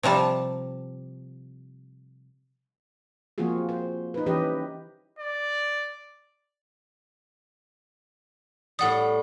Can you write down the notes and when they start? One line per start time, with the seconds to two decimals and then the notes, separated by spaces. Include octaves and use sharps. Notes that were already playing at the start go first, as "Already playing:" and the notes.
0.03 C3 F3 G3 A5
3.38 F3 A#3 C4 F4 F#4 G#4
3.69 C5
4.14 D#4 B4
4.26 E3 C#4 G4 B4 D#5
5.19 D5
8.79 A2 G3 F#5 D#6